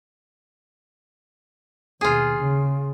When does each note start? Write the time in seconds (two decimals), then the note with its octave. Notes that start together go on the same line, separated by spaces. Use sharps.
2.01 D#2 B2 F4 G#4
2.37 C#3